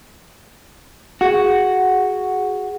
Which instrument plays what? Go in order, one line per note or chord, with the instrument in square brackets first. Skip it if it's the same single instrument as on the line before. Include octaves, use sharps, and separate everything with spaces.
[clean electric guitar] F#4 [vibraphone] G#4 F#5